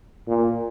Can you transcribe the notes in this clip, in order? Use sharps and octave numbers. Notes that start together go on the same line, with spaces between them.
A#2